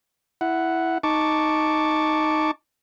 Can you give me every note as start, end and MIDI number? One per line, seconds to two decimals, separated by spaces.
0.41 0.98 64
0.41 0.98 78
1.03 2.51 63
1.03 2.51 81
1.03 2.51 85
1.03 2.51 86